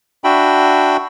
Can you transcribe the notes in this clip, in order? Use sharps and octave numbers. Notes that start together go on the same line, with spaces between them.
D4 F#4 E5 G5 B5